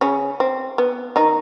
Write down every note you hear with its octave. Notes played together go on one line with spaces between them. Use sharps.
C#3 C#4
C4
B3
D#3 D#4